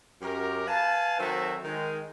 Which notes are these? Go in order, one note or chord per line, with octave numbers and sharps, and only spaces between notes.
F#2 G4 A#4
B4 F5 G#5 A5
D#3 F#3 C4 F#4 A4 E5
D#3 G#3